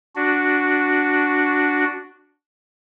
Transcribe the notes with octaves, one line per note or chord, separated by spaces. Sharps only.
D4 F#4